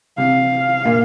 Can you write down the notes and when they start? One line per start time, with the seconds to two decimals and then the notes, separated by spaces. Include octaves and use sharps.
0.18 C3 F5
0.85 A#2